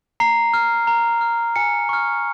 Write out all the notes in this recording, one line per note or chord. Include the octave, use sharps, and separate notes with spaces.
A#5 C7
F6
A#5
F6
G#5 C#7
C#6 F6